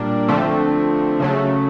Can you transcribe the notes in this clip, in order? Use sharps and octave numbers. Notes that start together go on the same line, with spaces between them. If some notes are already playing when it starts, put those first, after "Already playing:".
Already playing: A#2 G3 A#3 D4
D3 F3 A3 C4
C#3 F#3 A3